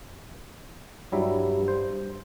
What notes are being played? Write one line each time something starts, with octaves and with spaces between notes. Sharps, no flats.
G2 F#3 G3 E4
C5